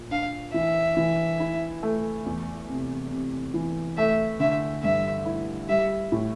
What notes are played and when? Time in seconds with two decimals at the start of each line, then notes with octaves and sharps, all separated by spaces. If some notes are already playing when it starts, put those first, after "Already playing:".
Already playing: A#2
0.11 D4 F5
0.54 E3 E5
0.97 E3
1.40 E4
1.83 A3
2.26 E2
2.69 C3
3.12 C3
3.54 E3
3.97 A3 E5
4.40 D3 E5
4.83 G2 E5
5.25 E4
5.69 G3 E5
6.12 A2